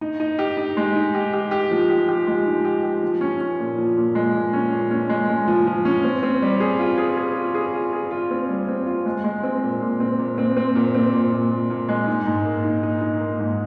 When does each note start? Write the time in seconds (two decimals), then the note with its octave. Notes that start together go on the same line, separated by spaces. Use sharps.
0.01 D#4
0.20 D#4
0.39 G4
0.57 D#4
0.77 G#3
0.96 D#4
1.14 G4
1.33 G4
1.51 G4
1.71 F3
1.89 G4
2.08 G4
2.27 G#3
2.46 D#4
2.65 G4
2.83 G4
3.02 F3
3.21 C#4
3.40 C#4
3.59 A#2
3.78 F3
3.97 A#2
4.15 G#3
4.34 A#2
4.53 C#4
4.72 A#2
4.91 C#4
5.09 G#3
5.29 G#3
5.48 F3
5.67 F3
5.85 C#4
6.04 C4
6.23 C4
6.42 G3
6.60 G#4
6.79 F4
6.98 G#4
7.17 G#4
7.36 F4
7.54 G#4
7.74 F4
7.93 G#4
8.11 F4
8.31 C4
8.49 G3
8.68 C4
8.86 F4
9.06 G#3
9.24 G#3
9.43 C4
9.62 A#2
9.81 A#2
10.00 C4
10.18 A#2
10.38 C4
10.57 C4
10.75 A#2
10.95 C4
11.13 A#2
11.31 A#2
11.50 A#2
11.70 A#2
11.88 G#3
12.07 D#4
12.26 G#2
12.45 A#3
12.64 D#4
12.83 D#4
13.01 D#4
13.20 A#3
13.39 G#2